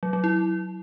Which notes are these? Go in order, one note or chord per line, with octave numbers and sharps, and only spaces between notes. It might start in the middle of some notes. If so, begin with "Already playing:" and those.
F#3
F#3
E4